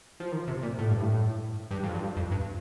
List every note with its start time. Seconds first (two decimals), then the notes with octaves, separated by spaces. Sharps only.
0.20 F3
0.32 D#3
0.48 C3
0.63 A#2
0.78 A2
0.90 G2
1.02 A2
1.71 G2
1.83 F2
1.94 G2
2.17 F2
2.32 G2